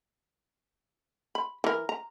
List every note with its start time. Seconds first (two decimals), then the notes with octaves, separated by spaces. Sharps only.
1.35 B5
1.64 E3 A#4
1.89 A#5